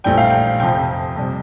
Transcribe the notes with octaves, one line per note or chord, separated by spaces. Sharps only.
A#1 A2 G3 D4 G5
F5
G5
F1 F2 C3 F3 C4 G5
F2 C3 G3